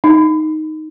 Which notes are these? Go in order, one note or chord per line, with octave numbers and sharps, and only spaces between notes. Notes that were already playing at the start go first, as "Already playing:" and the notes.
D#4